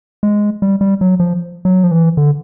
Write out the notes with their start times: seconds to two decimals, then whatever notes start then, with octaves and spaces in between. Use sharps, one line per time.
0.23 G#3
0.62 G3
0.81 G3
1.01 F#3
1.20 F3
1.65 F#3
1.84 F3
1.91 E3
2.17 D3